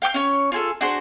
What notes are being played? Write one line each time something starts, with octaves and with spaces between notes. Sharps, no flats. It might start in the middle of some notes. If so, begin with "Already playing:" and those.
F5 G5 D6 G6
C#4 C#5
F4 G#4 A4
D4 F#4 G#4 C5